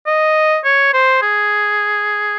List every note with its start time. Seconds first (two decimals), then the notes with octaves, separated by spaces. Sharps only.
0.06 D#5
0.65 C#5
0.93 C5
1.22 G#4